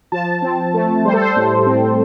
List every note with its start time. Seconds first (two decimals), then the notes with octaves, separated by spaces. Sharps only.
0.12 F3 A5
0.42 C4
0.74 A3
1.05 G3 C5
1.13 A4
1.21 C5
1.36 A2
1.67 C4